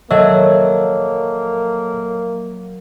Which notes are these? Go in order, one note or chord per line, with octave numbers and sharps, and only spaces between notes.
F#3 A#3 A4 C#5 D#5 E5 E6